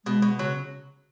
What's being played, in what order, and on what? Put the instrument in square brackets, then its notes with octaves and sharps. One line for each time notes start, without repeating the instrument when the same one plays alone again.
[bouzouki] B2 [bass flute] G#3
[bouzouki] B2
[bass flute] C#3 [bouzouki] F#3